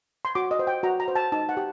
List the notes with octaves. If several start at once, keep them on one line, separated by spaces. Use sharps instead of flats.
C6
F#4 D6
D#5
C5
G5
F#4 A#5
A#5
C5
A5
D#4 A5
F#5
G4